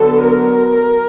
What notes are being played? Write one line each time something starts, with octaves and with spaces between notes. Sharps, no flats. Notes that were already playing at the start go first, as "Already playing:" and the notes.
Already playing: D3 F#3 B3 A4
A#4